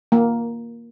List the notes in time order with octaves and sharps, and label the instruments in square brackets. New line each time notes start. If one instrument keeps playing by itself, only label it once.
[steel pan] A#3